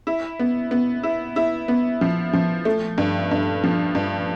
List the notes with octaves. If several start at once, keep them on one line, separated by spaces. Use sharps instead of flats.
E4
B3
B3
E4
E4
B3
F3
F3
A3
G2
G2
F3
G2